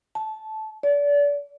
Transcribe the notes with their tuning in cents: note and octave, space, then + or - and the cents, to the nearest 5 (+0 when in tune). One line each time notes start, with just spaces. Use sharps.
A5 -15
D5 -30